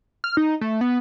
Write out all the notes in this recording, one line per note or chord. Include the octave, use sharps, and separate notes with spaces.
F6
D#4
A3
B3